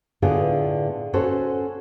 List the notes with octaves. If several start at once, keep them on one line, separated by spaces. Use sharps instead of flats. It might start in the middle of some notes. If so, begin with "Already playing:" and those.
A2 D3 B3 D4 F4 G#4
C#4 F#4 A4 C5